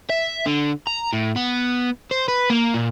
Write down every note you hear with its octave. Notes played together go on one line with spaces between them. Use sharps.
E5
D3
A#5
A2
B3
C5
B4
A#3
A#2